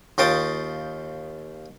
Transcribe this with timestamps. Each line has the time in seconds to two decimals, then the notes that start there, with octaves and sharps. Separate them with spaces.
0.18 D#2 F4 C#5 G5 A5 D#6